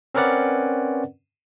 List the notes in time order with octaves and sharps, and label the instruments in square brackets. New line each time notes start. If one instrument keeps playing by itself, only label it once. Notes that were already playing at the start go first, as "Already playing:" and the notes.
[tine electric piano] C4 C#4 A#4 B4 D5 F#5